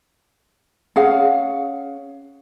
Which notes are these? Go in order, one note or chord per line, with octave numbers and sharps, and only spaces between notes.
C#4 G#4 F5 F#5